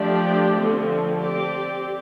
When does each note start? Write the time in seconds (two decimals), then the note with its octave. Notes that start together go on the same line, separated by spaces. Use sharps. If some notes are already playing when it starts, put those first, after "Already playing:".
Already playing: F3 A3 D4 G4 D5
0.56 D3 F3 A3 C4
1.21 C4 G4 D5